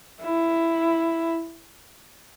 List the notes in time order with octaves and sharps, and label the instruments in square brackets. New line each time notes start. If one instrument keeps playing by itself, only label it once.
[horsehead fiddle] E4